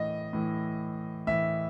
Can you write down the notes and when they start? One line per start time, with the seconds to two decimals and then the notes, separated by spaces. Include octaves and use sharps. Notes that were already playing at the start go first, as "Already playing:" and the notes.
Already playing: A2 E3 D#5
0.33 A2 E3
1.27 A2 E3 E5